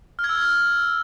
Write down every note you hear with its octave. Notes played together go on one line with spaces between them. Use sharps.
F6
G#6
E6